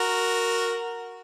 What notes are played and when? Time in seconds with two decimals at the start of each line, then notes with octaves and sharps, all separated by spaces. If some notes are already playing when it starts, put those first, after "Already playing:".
Already playing: F#4 A#4